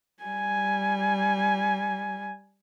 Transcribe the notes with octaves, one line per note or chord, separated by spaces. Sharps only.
G3 G#5